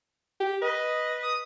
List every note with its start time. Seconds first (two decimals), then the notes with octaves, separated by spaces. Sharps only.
0.40 G4
0.62 B4 D#5
1.23 D#6